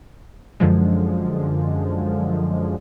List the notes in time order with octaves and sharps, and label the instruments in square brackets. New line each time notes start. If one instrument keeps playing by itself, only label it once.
[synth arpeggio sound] F#2 D3 F3 G#3